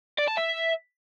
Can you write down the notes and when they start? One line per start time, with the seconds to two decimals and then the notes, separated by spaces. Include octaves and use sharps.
0.19 D5
0.28 A5
0.38 E5